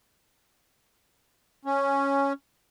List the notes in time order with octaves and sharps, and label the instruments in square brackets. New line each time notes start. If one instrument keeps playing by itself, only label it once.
[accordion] C#4